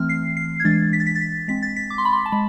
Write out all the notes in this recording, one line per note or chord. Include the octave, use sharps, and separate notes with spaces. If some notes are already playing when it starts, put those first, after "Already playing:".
Already playing: E3 A3 C4 F6
C7
C7
G#6
E3 G#3 D4 A6
B6
A6
B6
A6
B6
G#3 C4 B6
A6
B6
D6
C6
B5
C6
A5
G#3 B5